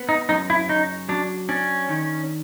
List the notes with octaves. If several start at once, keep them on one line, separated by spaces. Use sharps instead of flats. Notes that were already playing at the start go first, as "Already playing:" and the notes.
Already playing: B3
D#4
F#2 D#4
E4
C#3 D#4
F#3 D4
C#4 D4
D#3